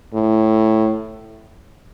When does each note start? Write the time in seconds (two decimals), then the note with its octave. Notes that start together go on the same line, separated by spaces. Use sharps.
0.14 A2